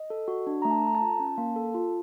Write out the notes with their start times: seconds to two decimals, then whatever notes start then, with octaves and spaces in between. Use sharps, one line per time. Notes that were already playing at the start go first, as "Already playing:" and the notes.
Already playing: D#5
0.10 A4
0.28 F#4
0.47 D4
0.62 A3 A#5
0.71 A5
0.83 A4 A#5
0.95 A5
1.01 F4
1.20 C#4
1.38 A#3
1.56 A4
1.74 F4